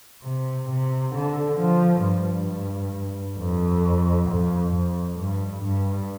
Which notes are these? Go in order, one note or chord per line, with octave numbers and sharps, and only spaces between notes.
C3
C3
D3
F3
G2
F2
F2
F2
G2
G2